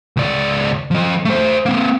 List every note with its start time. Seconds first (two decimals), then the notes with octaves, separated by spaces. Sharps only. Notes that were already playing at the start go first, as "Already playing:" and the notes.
0.17 C#2 D5
0.91 F3 D#5
1.25 A3 C5
1.66 A#3 C4